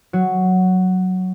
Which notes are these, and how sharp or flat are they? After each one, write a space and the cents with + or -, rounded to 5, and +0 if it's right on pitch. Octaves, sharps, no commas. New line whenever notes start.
F#3 +0 F#4 +0